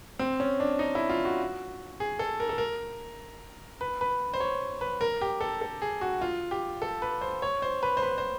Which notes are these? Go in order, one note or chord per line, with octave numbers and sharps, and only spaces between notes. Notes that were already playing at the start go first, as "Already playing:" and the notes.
C4
C#4
D4
D#4
E4
F4
F#4
G#4
A4
A#4
A4
A#4
B4
B4
C5
C#5
B4
A#4
G4
A4
A4
G#4
F#4
F4
G4
A4
B4
C5
C#5
C5
B4
C5
B4
C5